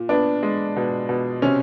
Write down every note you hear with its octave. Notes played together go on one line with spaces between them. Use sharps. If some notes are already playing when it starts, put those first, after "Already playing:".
Already playing: A#2
B3 D4
G#3
B2
B2
C3 C#4